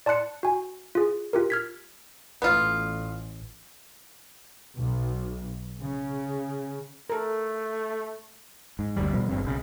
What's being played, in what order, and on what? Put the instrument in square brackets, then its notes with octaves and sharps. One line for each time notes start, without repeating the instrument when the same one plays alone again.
[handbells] D5 A5 C6 F#6 C#7
F#4 G#5
F4 G#4
F4 G4 A#4
F6 G#6 B6
[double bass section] A1 [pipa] B3 F4
[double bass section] B1
C#3
[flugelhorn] A3 [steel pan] A4 A#4
[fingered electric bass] G#2
F#1 D2 G3
B2 F3 G3 B3
G#1 G2 C4
B1 C#3